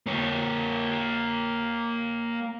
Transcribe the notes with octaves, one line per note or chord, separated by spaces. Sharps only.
A#3 C#5